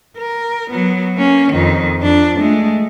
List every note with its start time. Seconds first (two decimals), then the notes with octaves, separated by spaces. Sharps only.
0.17 A#4
0.71 F#3 B3
1.16 A#3 C#4
1.52 F2 D#3
2.02 F2 D4
2.39 G#3 A3